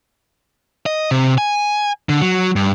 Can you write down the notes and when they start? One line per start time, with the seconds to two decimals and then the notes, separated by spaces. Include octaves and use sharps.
0.86 D#5
1.11 C3
1.38 G#5
2.09 D3
2.22 F#3
2.56 G2